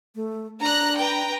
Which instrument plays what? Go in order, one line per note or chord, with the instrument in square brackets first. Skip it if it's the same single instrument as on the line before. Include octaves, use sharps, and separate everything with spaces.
[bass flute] A3
[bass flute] D4 [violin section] A#5 F#6
[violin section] B4 G5 A#5